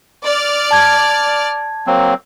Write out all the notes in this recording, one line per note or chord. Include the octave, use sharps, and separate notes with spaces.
D5 F6
A5 G#6
F#3 A#3 C4